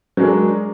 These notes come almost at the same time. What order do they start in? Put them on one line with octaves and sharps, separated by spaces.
F#3 G#3 A#4 D4